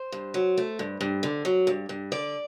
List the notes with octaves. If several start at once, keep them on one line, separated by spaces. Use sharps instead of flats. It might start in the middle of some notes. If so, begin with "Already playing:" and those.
Already playing: C5
G2
F#3
A3
G2
G2
D3
F#3
G2
G2
D3 D5